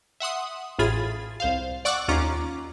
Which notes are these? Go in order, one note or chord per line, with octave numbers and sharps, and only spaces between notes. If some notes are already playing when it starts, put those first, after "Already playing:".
E5 F#5 C6 D#6
A1 A2 F4 G#4 B5 A6
C2 C5 F5
D5 F#5 C#6 D6 E6 F#6
D#2 C#4 F4 A#5 D6